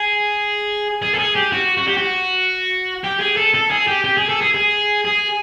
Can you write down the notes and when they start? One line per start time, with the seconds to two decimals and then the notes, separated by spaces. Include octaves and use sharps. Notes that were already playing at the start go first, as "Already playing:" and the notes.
Already playing: G#4
1.02 G#4
1.14 A4
1.19 G#4
1.36 G4
1.52 F#4
1.77 F#4
1.88 G4
1.97 F#4
3.04 G4
3.20 G#4
3.37 A4
3.54 A4
3.71 G#4
3.88 G4
4.04 G4
4.17 G#4
4.29 A4
4.41 G#4
4.55 G#4
5.05 G#4